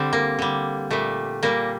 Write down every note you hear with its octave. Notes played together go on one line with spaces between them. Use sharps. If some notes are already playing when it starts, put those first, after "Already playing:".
Already playing: D3 G3 C4
A#3
D3 G3
A#2 G3 A3
A#2 G3 A#3